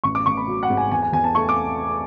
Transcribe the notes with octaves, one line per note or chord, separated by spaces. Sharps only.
A1 C#6
D6
A1 C#6
B5
F#3
F#5
G#2
G#5
E2 G#5
G#5
E2 G#5
A5
A3 C#6
D6